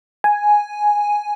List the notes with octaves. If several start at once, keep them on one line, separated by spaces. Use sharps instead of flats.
G#5